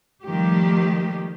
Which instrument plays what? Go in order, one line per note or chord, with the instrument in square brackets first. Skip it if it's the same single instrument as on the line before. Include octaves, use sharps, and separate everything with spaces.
[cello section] D#3 F3 G3 A3 G4